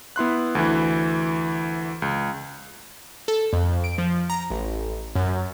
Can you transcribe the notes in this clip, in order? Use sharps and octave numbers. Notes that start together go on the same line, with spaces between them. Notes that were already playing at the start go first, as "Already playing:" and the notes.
B3 E4 C6 F#6
D2 E3
C#2
A4
F2
D7
F3
A#5
A1
F#2